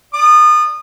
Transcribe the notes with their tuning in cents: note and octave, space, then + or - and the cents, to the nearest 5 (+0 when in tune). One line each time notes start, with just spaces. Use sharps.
D5 -10 D#6 -30